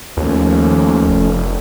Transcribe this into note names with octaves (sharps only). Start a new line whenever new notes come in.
D#2 F3 A3 C#4
F1